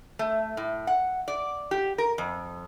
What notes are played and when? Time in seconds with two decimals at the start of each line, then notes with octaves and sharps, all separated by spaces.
0.19 A3
0.57 A2
0.87 F#5
1.28 D5
1.71 G4
1.98 A#4
2.18 F2